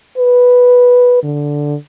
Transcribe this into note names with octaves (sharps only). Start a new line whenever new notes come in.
B4
D3